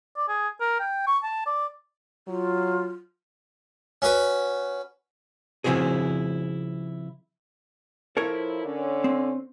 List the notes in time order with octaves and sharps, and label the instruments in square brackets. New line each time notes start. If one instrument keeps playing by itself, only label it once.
[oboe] D5
G#4
A#4
G5
C#6
A5
D5
[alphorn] F#3 [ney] F4
[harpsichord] C#4 F#4 B4
[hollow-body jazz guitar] C#3 F3 C4 E4 F#4 G#4
[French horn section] F3 E4 [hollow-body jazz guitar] A4 A#4 C#5
[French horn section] D3 C#4
[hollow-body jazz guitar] C4